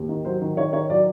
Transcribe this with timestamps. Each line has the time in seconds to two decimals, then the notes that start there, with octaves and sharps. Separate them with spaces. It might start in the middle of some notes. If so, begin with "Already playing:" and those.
Already playing: D#2
0.09 D#3
0.25 F#3 C5
0.42 D#3
0.57 D#3 C#5
0.73 D#3 C#5
0.90 F#3 D5